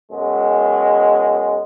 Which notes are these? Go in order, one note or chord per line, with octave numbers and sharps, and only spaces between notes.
F#2 B2 G#3